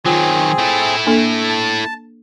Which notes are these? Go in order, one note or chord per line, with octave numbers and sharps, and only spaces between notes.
D#3 F#3 C4 F4 G#4
A3 E4
A#3 D4 A4
A5